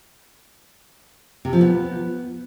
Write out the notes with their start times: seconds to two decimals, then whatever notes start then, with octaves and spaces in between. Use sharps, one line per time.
1.45 C3
1.53 F3
1.61 B3